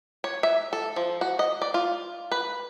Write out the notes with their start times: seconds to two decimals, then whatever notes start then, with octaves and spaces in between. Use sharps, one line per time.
0.24 C#5
0.43 E5
0.73 A4
0.96 F3
1.21 F#4
1.39 D#5
1.62 D5
1.74 F4
2.31 B4